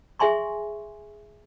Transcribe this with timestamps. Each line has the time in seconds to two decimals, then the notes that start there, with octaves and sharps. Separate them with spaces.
0.19 G#4 E5 G#5 C6 C#6